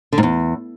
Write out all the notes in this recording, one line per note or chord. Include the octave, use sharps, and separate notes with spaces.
D3
G#2
E2